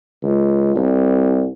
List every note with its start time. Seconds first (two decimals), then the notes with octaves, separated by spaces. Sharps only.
0.23 C#2
0.76 C2